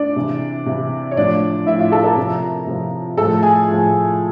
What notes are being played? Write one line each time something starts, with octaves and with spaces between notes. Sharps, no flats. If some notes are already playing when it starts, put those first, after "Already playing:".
Already playing: D4 D5
C3 E3
C3 E3
C#5
A2 F3 D4 D5
A2 F3 E4 E5
F4 F5
A4 A5
A#4 A#5
C3 F3
C3 F3
A2 F3 A4 A5
G#4 G#5
A2 F3